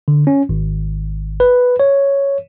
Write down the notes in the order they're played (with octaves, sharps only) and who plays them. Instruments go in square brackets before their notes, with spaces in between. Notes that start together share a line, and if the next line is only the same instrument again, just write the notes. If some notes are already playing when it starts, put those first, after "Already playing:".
[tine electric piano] D3
C#4
G#1
B4
C#5